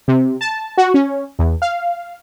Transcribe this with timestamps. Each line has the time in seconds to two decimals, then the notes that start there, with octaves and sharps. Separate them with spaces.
0.08 C3
0.41 A5
0.77 F#4
0.94 C#4
1.39 E2
1.62 F5